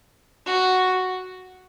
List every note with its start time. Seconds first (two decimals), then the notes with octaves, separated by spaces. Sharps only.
0.46 F#4